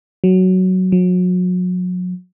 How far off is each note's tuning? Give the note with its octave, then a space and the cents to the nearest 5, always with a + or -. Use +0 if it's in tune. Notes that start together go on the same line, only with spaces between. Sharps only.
F#3 +5
F#3 -35